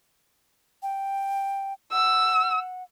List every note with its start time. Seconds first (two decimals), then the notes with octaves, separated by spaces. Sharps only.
0.83 G5
1.92 F#5 E6